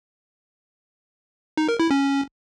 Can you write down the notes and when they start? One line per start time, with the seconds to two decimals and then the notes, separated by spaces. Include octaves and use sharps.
1.57 D#4
1.69 A#4
1.80 E4
1.91 C#4